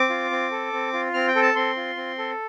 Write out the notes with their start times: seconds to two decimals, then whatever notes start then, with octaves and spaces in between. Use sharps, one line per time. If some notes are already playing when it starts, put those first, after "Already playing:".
Already playing: C4 D6
0.10 F4
0.31 C4
0.51 A4
0.73 C4
0.93 F4
1.14 C4 F6
1.28 G5
1.35 A4
1.42 A5
1.55 C4 C6
1.76 F4
1.97 C4
2.18 A4